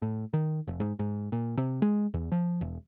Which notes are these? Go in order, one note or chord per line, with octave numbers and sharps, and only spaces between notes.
A2
D#3
F1
G#2
G#2
A#2
C3
G#3
E2
F3
E1